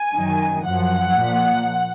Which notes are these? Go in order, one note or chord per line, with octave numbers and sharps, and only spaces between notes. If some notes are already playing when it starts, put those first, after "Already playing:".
Already playing: G#5
F#2 D#3
F#2 F3 F#5
A#2 F3